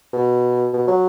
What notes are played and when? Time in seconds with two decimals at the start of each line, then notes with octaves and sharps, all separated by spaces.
0.13 B2
0.73 B2
0.88 F#3